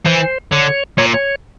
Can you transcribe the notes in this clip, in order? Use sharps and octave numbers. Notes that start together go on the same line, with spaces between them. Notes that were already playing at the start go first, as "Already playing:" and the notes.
E3 C5
D3 C#5
A#2 C#5
C#5